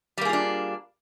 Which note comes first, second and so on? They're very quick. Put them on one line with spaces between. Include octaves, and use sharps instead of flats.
G3 A#3 G#4 F4 D4